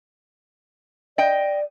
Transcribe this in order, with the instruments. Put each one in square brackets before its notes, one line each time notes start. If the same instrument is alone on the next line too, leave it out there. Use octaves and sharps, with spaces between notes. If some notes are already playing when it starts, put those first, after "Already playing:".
[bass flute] D5 [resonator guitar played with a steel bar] D#5 G5